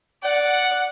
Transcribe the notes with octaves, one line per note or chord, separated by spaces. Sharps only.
D5 F#5